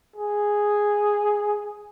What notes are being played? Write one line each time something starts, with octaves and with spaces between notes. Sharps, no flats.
G#4